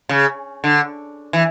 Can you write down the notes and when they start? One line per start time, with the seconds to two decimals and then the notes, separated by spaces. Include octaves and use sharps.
0.09 C#3
0.64 D3
1.33 E3